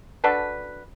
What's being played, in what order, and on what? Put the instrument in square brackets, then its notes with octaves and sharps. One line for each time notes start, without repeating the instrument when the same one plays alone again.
[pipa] D4 F#4 A4 B4